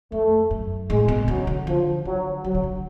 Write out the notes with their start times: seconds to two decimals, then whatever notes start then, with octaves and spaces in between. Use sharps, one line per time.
0.12 F2 A3
0.51 F#2
0.90 A2 G#3
1.08 B2
1.28 C#3 F#3
1.47 D3
1.66 D3 F3
2.05 D3 F#3
2.44 D3 F#3
2.55 C#3
2.63 D3